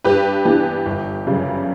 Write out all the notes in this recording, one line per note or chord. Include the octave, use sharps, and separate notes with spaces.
G2 G4 B4
E3 B3 D4 G4
G1
F#2 C#3 G3